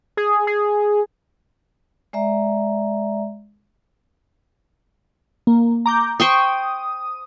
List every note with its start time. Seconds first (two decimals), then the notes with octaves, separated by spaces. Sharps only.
0.17 G#4
0.47 G#4
2.13 G#3 D5 E5 A#5
5.47 A#3
5.86 A#5 D6 G6
6.20 C5 G5 C#6 D#6